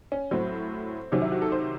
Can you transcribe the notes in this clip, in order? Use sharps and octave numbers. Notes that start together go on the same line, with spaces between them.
C#4
A2 F#3 C4
C3 D#3 F#3 C#4
E4
F#4
A4
C5